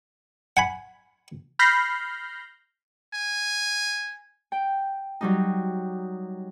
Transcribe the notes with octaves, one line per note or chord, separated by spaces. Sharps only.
F#5 G#5 B5
B5 F6 G6 A#6 C7
G#5
G5
F#3 G3 D#4